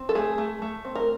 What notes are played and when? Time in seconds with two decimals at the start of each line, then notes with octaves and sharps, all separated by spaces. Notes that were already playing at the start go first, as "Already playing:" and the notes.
Already playing: C4
0.09 A4
0.15 A3 G#4
0.38 A3
0.62 A3
0.85 C4
0.95 A#4